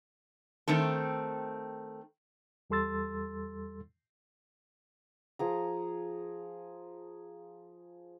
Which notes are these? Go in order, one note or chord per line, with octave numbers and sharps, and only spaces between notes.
D#3 A3 C4 A4
E2 G3 A4 C6 E6 A6
F3 G#4 A#5